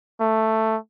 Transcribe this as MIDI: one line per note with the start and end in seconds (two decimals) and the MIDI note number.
0.20 0.77 57